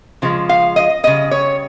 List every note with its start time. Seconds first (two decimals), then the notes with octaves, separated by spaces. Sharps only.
0.22 C#3 F3 G#3
0.49 F5
0.76 D#5
1.03 C#3 G3 D#5
1.31 C#5